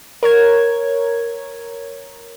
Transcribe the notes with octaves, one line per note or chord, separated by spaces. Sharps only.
A#4 C#5 G#6